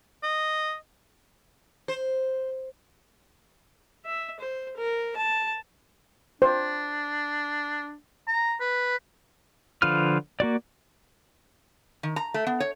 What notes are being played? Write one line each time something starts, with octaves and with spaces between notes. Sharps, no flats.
D#5
C5
E5
C5
A#4
A5
D4 C5
A#5
B4
D3 F3 F4 B4 F6
A#3 F#4 D5
D#3
A#5
A3
B3
C#5